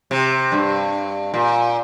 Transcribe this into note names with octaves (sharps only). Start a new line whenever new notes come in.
C3
G2
A#2